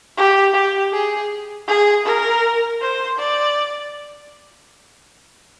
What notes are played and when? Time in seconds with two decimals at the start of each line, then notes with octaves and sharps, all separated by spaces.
0.17 G4
0.54 G4
0.93 G#4
1.68 G#4
2.05 A#4
2.81 C5
3.18 D5